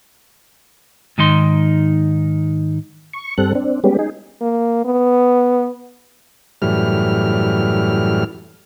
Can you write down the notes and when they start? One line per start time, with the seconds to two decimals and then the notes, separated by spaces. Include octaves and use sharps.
1.18 G#2 D#3 D#4 C6
3.14 C#6
3.38 G2 G3 C4 A4 F#6
3.55 C4 D4
3.84 G3 G#3 B3 C#4 G4
3.99 D#4 G#4
4.41 A#3
4.85 B3
6.62 F#2 A2 E3 G3 F6